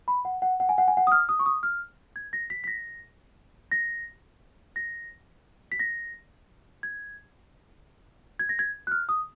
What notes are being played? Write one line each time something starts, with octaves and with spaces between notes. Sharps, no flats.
B5
F#5
F#5
F#5
G#5
F#5
G#5
F#5
D#6
F6
D#6
C#6
D#6
F6
G#6
A#6
B6
B6
A#6
A#6
A#6
B6
A#6
G#6
G#6
A#6
G#6
F#6
F6
D#6